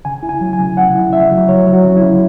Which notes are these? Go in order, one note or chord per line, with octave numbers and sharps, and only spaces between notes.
C#3 G#5
E4
G#5
F#3
G#5
C#3
C#3 F#5
E4
C#3 E5
F#3
F#3 C#5
F#3
F#4
C#3
E4
C#3